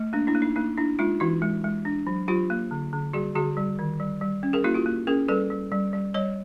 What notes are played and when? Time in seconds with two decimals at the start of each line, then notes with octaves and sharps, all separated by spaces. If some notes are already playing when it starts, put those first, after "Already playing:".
Already playing: A3
0.13 A#3 D4
0.27 D4 E4
0.35 A#3
0.42 D#4
0.56 A#3 D#4
0.78 D4 E4
0.99 G#3 D#4 F4
1.20 E3 E4 F#4
1.42 G#3
1.64 G#3
1.85 D4
2.07 F#3
2.28 F#3 F4 G4
2.50 A#3
2.71 D3
2.93 D3
3.13 G3 F#4 G#4
3.36 D3 F#4 G#4
3.57 G3
3.79 D#3
4.00 G3
4.21 G3
4.43 C#4
4.53 G#4 A#4
4.64 A#3 E4 F#4
4.74 F4 G4
4.86 A#3
5.07 C#4 G#4 A#4
5.28 G3 A4 B4
5.50 G3
5.72 G3
5.93 G3
6.14 G3 C#5 D#5